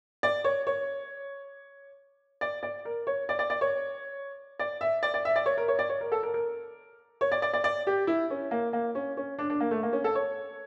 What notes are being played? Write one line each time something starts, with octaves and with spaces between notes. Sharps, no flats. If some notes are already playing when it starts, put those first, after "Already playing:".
D5
C#5
C#5
D5
D5
A#4
C#5
D5
D5
D5
C#5
D5
E5
D5
D5
E5
D5
C#5
A#4
C#5
D5
C#5
A#4
A4
A#4
A#4
C#5
D5
D5
D5
D5
G4
E4
C#4
A#3
A#3
C#4
C#4
D4
D4
A#3
A3
A#3
C#4
A4
C#5